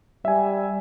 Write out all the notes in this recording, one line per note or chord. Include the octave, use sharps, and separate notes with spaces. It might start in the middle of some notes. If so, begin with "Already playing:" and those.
G3 E5 G#5